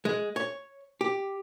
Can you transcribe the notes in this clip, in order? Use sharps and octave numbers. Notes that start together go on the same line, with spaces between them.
G#3
C#5
G4